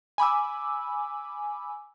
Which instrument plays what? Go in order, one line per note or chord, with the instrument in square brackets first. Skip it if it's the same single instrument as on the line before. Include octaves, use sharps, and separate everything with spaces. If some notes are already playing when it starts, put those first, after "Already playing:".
[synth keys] G#5 B5 D6 E6